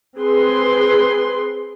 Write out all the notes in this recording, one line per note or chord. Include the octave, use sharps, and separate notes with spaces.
C4 G#4 B4 C6